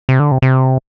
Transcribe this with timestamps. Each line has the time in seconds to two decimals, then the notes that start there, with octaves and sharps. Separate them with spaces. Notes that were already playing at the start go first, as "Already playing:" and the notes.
0.09 C3
0.20 D3
0.32 C3
0.42 C3